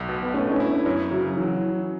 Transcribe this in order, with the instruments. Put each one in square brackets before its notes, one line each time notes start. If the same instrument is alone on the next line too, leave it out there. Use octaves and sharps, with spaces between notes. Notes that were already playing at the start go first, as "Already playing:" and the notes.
Already playing: [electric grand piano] B1
B2
[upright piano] B3
[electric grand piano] A3 [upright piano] C#4
[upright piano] D4
C#4
[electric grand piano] E4
[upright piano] C#4
[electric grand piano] F#2 [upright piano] C#4
[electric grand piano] C#3 [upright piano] F#3
[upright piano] E3 [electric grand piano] F#3